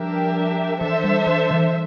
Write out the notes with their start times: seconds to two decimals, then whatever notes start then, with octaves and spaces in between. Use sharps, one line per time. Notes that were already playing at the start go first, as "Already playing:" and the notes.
Already playing: F3 G3 D4 G4 A#4 E5
0.80 E3 D4 A4 C5 E5
1.04 G3
1.27 E3
1.51 E3